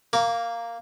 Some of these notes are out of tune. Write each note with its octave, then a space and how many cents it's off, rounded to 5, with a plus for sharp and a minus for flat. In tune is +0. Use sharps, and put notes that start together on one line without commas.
A#3 -5 A#4 +0 D6 -45